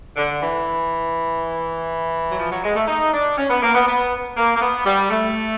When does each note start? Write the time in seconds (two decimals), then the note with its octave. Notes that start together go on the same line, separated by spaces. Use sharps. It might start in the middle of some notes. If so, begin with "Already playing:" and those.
0.16 D3
0.41 E3
2.30 F#3
2.39 F3
2.51 F#3
2.63 G#3
2.76 A3
2.88 D#4
3.13 D4
3.37 C#4
3.50 B3
3.62 A#3
3.74 B3
3.87 B3
4.36 A#3
4.56 A#3
4.61 B3
4.86 G3
5.10 A3